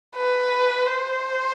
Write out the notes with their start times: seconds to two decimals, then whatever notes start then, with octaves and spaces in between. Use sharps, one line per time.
0.16 B4
0.87 C5